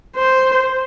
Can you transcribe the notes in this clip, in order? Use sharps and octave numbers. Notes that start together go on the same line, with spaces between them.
C5